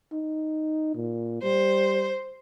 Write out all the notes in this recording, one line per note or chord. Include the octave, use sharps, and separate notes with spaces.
D#4
A#2
G3 C5